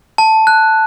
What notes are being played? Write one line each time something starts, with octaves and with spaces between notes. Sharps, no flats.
A5
F#6